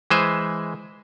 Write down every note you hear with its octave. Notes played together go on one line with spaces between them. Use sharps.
E3 G#3 B4 C5 E5